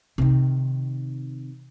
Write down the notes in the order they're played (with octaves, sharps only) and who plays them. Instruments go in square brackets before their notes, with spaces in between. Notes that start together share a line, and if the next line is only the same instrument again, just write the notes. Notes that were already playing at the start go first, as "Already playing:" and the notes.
[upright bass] C3 D#3